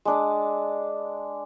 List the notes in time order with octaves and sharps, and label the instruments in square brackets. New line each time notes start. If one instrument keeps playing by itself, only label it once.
[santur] G#3 D4 D#6